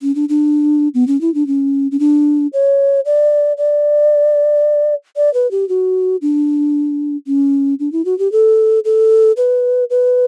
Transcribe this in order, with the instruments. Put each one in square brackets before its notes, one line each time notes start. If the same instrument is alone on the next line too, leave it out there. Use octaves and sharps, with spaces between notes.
[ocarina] C#4
D4
D4
B3
C#4
E4
D4
C#4
C#4
D4
C#5
D5
D5
D5
B4
G4
F#4
D4
C#4
D4
E4
F#4
G4
A4
A4
B4
B4